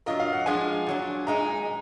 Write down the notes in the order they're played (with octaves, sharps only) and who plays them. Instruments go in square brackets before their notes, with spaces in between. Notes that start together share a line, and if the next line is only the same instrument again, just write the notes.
[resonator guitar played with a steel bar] F#3 D4 F4 A#4 [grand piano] D#5
[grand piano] F5
F#5
[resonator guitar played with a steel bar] F3 G#3 D4 F4 [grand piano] G#5
[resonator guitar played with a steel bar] A#2 F#3 D4
[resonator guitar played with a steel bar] A#2 G#3 D#4 [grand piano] A#5